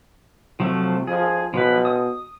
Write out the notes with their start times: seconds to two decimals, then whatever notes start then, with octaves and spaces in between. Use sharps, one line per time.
0.60 C3 F3 F#3 A3
1.07 F3 G#4
1.54 B2 F3 B4
1.85 D#6